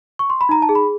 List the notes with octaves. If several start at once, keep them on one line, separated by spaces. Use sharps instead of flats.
C#6
C6
B5
D#4 A#5
A5
G#4
B5